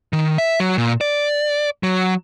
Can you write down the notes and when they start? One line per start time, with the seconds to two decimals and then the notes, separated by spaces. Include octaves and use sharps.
0.13 D#3
0.38 E5
0.60 F#3
0.78 A#2
1.01 D5
1.83 F#3